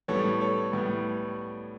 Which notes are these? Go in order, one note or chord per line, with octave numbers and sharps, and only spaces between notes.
A2 G3 B3 A4 C#5
A4 C#5
A2 G3 B3